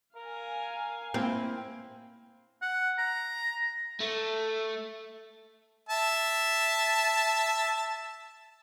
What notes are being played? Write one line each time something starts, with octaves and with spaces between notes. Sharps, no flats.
A#4 F5 G#5
A#3 C4 E4
F#5
A#5
A3
E5 A5